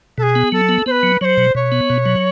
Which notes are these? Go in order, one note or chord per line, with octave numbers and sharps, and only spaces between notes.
B2 G#4 A4
B3
F#3 A4
B3
B3 B4 C5
F#3
F#3 C5 C#5
B2
B2 C#5
B3
B2
F#3